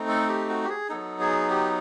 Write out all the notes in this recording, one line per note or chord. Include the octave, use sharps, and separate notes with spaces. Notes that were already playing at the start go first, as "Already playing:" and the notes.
Already playing: A3 C4 D#4
A4
G4
F#4
G4
G#4
F#3 B3 D#4 A4
G#4
G4